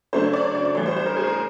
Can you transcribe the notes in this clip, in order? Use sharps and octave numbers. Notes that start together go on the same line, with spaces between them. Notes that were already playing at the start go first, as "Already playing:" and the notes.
C#3 F#3 A3 D4 C5
C#5
D5
C#5
D5
D5
A2 E3 G3 C#5
C5
C5
A#4
G#4
A#4